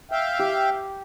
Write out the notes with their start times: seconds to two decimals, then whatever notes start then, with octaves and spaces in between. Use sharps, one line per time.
0.11 E5 F5 G5
0.39 G4